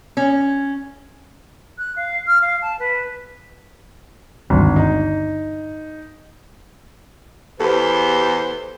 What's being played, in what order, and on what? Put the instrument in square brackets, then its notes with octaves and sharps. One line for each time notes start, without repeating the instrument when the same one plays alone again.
[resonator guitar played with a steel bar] C#4
[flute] F#6
F5
F6
F5
A5
B4
[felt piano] G#1 [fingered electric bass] D2 G2 D3
[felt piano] D#4
[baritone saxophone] E2 [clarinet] G4 [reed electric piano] A4 B4 [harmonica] C5